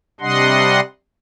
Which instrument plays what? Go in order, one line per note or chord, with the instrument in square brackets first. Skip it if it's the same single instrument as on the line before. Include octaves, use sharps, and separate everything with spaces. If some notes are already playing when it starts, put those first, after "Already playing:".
[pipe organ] C3 G3 D4 D#5 F#5 C6